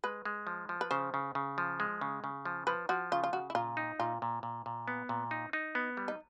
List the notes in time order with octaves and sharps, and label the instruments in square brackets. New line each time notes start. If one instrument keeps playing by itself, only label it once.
[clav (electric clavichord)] G#3 [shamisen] B4
[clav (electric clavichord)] G#3
F3
F3
[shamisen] B4
[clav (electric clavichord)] C#3 [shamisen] C5
[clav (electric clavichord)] C#3
C#3
F3
G#3
C#3
C#3
F3
[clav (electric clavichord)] F3 [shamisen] B4
[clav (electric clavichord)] F3 [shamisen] F#4
[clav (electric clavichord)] C#3 [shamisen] F4
[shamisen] F4
[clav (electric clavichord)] C#3 [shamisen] F#4
[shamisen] E4
[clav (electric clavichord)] A#2 [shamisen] F4
[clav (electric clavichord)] D#4
[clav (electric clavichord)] A#2 [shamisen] F4
[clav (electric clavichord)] A#2
A#2
A#2
B3
A#2
D#4
D#4
B3
G3
[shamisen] D#4